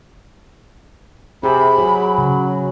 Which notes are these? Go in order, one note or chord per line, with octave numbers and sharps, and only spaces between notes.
C3 G#4 B5
F#3 G#4
C#3